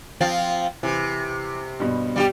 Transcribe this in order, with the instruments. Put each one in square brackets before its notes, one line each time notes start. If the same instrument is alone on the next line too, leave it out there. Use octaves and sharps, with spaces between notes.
[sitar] F3 C4 F4
[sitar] C3 [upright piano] E3
[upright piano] G2 B2
[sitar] G3 F#4 G4